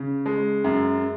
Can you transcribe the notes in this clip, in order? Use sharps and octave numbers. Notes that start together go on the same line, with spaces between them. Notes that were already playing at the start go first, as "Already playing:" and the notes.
Already playing: C#3
G#3
F#2